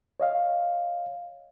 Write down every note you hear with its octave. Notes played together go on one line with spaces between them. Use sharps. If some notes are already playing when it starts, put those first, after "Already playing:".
C#5 D#5 F5